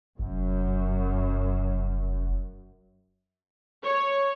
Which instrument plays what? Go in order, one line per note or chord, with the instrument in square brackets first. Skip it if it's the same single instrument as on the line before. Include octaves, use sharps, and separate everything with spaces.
[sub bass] F1 [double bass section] F#2
[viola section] C#5